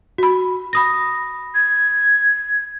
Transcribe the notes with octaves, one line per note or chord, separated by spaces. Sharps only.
F#4 B5
B5 D#6 A#6
G#6